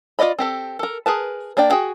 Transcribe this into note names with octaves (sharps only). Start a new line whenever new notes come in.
F4 A#4 D5 D#5 B5
C4 G4 A4
A4 A#4
G#4 A#4 B4 A5
A#3 D4 D5 G5
F#4 G#4 G5